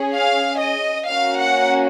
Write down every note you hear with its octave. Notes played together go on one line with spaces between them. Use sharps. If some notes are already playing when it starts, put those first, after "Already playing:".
Already playing: C#4 G#4
F5
D#5
A#3 C#4 F#4 F5
F#5